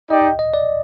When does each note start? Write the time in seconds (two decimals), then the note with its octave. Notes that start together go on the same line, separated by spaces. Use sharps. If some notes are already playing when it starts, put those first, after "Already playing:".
0.10 D#4 G4 D5 D#5 G5
0.39 D#5
0.54 D5